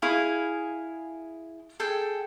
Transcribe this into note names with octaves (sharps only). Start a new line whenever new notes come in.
E4 G#4 F5 G#5
G#4 A4 G5